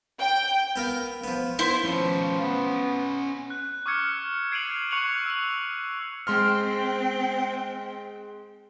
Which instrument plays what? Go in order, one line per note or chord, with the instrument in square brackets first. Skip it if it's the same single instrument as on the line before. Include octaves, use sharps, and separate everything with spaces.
[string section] G5
[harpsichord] B3 A#4 F5
F3 B3
[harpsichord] B3 [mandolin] E4 C5
[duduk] F3 [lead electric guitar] C#4 B4
[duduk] B3
[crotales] F#6
C#6 D6 E6 F6 G#6 C#7
G#6 C7 D7 D#7 F7 F#7
C#6 F#6 C#7 F7 F#7
E6 F#7
[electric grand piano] G#3 C6 F6 [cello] C4 G5